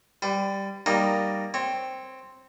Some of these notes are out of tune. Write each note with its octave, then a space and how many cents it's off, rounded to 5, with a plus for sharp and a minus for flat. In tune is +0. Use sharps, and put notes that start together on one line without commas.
G3 +0 B4 +45
G3 +0 A#3 +0 D#4 -15
C4 +0 C#5 -15